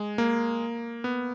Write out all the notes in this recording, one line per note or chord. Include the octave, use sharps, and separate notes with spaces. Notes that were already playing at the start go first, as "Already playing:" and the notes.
Already playing: G#3
A#3
B3